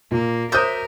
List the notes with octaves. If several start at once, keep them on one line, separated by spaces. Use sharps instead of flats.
A#2 A#3
F#4 A#4 C5 C#5 E5 D6 D#6 G6